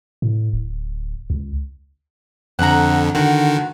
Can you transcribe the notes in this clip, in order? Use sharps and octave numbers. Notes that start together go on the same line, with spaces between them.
A2
D1
C#2
F2 D3 F#5 A#5
D3 D#3 F#4